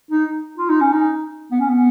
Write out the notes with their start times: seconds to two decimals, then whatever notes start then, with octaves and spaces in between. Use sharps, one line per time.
0.11 D#4
0.58 F4
0.70 D#4
0.81 C#4
0.92 D#4
1.52 B3
1.60 C#4
1.69 B3